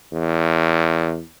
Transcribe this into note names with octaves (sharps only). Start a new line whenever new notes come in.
E2